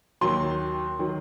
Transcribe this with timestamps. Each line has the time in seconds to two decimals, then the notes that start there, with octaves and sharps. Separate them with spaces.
0.21 D#2 D#3 F#3 C6
0.99 D#3 F#3